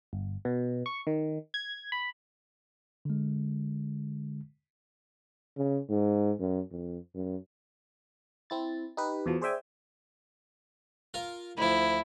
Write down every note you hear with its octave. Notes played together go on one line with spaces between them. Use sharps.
G1
B2
C#6
D#3
G#6
B5
D3 G#3
C#3
G#2
F#2
F2
F#2
C4 E4 A6
D#4 G4 B4
E2 B2 F3
G#4 C5 D5 E5 G5 G#5
F4 A#4
D2 F3 E4